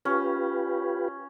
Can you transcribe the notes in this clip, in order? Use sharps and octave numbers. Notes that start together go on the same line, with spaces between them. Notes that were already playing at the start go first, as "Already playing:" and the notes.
C#4 F4 G4 B4